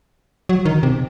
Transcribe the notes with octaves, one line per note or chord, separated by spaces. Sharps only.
F#3
D#3
C3